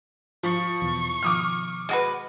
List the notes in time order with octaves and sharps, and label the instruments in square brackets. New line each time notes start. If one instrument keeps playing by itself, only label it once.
[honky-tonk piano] F3 [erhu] C#6
[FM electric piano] E2 B2 E3
[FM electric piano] B2 D#3 F3 [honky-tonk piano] D6 D#6 F6
[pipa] G#3 F#4 B4